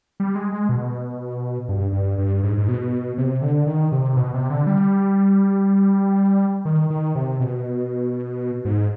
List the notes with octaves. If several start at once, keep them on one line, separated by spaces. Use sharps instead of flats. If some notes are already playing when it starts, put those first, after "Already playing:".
G3
G#3
G#3
B2
G2
G2
G2
G#2
G#2
B2
C3
D3
D#3
C3
B2
C3
D3
G3
D#3
D#3
C3
B2
G#2